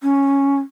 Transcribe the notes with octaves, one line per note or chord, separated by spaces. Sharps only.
C#4